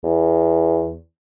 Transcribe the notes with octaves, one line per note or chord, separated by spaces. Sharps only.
E2